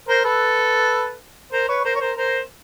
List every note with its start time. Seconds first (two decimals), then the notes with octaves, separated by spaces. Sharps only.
0.08 A#4 C5
0.24 A4 B4
1.52 A#4 C5
1.69 B4 C#5
1.85 A#4 C5
1.95 C#5
2.00 A#4 C5
2.17 A#4 C5